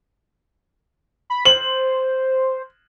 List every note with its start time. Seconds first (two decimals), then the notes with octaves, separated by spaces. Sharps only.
1.30 B5
1.45 C5 F#7